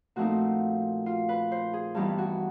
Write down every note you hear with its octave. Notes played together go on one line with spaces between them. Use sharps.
A#2 F3 A3 C4 D#4 F#4
F4
B4
C5
G#4
G2 E3 G3 B3 D#4 G4
F#4